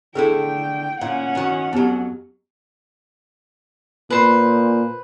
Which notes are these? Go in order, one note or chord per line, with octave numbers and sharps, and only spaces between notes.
D3 A3 E4 G#4 A4 G5
A#2 C#4 F5 F#5
D#3 F#4
F2 F#3 B3 G4
A#2 B4 C5